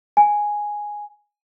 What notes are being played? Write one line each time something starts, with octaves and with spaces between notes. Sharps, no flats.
G#5